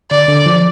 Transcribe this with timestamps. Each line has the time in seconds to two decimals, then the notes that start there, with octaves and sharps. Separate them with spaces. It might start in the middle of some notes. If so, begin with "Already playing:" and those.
0.11 D3 D5
0.28 D3
0.46 F3